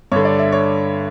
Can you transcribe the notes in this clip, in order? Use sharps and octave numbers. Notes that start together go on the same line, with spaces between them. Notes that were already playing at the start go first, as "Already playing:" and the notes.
G2 D3 C#5
D5
E5
C#5